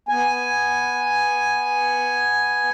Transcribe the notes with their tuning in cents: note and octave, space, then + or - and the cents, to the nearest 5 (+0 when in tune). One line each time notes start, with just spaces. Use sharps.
B3 +0 G#5 +0